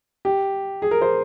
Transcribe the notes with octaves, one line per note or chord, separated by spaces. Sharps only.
G4
G#4
A#4
C5